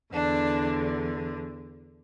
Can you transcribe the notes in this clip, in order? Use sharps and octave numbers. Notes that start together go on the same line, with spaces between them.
E2 D3 D4